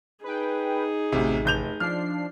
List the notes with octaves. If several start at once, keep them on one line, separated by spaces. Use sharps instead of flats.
D#4 G#4 B4 G5
A1 D2 C3
F1 G6 F7
F3 D4 F6 C7